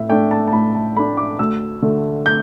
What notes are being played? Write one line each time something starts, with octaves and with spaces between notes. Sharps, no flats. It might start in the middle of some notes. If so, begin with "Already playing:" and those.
Already playing: A2 E5
A3 D4 G5
A5
A5
A2 B5
A5
A3 D4 B5
D6
D2 E6
D3 A3
G6